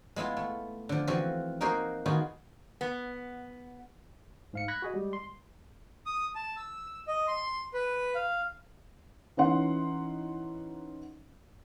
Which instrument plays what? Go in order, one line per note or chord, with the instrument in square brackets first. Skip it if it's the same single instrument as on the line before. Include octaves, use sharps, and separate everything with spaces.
[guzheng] G#3 B3 E4 F4
A3
D3 F3
E3 F3 C4 F#4
A#3 D#4 F#4 G#4 A#4 C5
D#3 B3 D#4 F4 F#4 G#4
[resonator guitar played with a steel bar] B3
[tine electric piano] G#2 F5 C#7
B5 F#6 G#6 A#6 B6
F#4 G#4 D#5
G3 G#3
C6
[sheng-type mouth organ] D#6
A5
E6
D#5
C6
B4
F5
[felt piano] E3 C#4 D#4 E4 F#5 C6